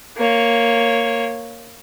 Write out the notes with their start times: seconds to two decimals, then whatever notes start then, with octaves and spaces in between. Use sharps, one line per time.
0.17 A#3 C#5